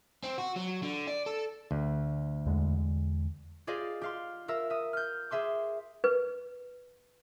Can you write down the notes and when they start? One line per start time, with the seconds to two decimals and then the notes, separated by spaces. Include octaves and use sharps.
0.24 C4
0.38 F#4
0.56 F#3
0.83 D3
1.07 D5
1.26 A4
1.71 D2
2.46 E2 D3 G#3
3.67 F4 G4 G#4 D5 D#5 F5
4.01 G4 F5 C6
4.48 F4 A#4 E5 E6
4.70 E5 D#6
4.93 F6 G6
5.31 G#4 E5 C6 D6
6.04 B4